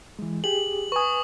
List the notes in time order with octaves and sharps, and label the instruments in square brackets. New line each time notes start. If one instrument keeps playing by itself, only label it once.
[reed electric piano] E3 G#3
[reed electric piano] G4 G#4 [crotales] F#7
[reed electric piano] B4 G#5 [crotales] C#6 D#6